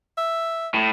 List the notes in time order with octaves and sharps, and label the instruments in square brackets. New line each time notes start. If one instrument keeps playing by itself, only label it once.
[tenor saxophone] E5
[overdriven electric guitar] A2